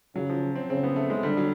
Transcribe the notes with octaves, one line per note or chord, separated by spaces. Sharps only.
C#3 F#3
F3
C4
C#3 C4
B3
A3
G#3
D3 G3
F#3